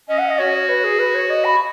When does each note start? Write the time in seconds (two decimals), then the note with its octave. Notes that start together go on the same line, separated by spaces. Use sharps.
0.09 C#4 D#5
0.18 F#5
0.29 D#5
0.39 F#4 C#5
0.54 C#5
0.69 B4
0.84 G#4
0.99 B4
1.15 C#5
1.30 D#5
1.45 B5